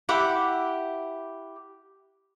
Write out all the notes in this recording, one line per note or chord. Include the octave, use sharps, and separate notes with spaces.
E4 G4 F#5 D6